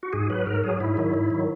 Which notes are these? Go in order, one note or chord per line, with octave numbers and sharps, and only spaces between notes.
F#4
G#2 G#4
F#3 B4
G#2 A#4
F#3 G#4
G#2 E4
D#3 F#3
G#2
D#3 F#3